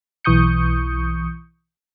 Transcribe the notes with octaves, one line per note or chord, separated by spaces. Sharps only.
B1 E3 C#6 D#6 G6 C#7